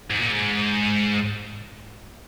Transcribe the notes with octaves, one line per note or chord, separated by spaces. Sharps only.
G#2
A#2
G#2